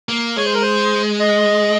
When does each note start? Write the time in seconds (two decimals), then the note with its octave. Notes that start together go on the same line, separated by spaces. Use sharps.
0.09 A#3
0.36 G#3 C#5
0.46 C5
0.54 A#4
0.62 C5
1.20 D#5